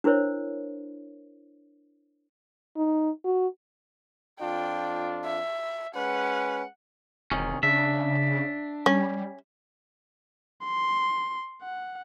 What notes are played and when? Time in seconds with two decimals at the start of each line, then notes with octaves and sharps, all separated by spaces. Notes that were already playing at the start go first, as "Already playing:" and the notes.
0.04 D4 E4 A#4 C5 C#5
2.77 D#4
3.24 F#4
4.40 F2 D4 F4 G5
5.25 E5
5.95 G#3 C#4 B4 F#5
7.31 E1 C3 D#3 C#4
7.63 C#3 D4 E5
8.86 G3 C#4
10.64 C6
11.62 F#5